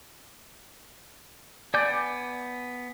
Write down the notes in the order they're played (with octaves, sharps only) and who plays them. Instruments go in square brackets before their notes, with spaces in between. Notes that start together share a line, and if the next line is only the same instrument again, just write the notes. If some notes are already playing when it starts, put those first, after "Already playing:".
[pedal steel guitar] B3 G#5 G6 [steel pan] D5